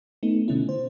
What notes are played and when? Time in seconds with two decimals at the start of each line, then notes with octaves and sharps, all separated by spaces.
0.23 A3 B3 D#4
0.48 B2 D3 C#4 E4
0.69 C5